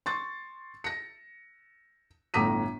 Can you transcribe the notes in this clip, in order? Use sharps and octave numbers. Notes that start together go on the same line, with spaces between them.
C6 C#6 A6
A#6 C#7
G1 A2 A#5 D6 B6 D#7